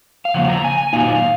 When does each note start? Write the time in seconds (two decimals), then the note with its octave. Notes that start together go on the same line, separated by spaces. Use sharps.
0.25 F5
0.34 C#3 F3 A#3 F#5
0.48 A#5
0.64 G#5
0.78 G#5
0.93 A#2 F#3 A#3 D#4 F5